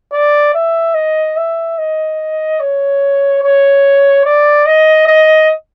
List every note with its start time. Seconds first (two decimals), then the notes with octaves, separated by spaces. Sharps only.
0.13 D5
0.54 E5
0.95 D#5
1.37 E5
1.78 D#5
2.60 C#5
3.43 C#5
4.26 D5
4.66 D#5
5.07 D#5